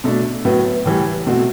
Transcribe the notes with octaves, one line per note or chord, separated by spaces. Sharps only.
B2 A3 D4
A2 F#3 B3
A2 E3 G3
B2 A3 C4 F#4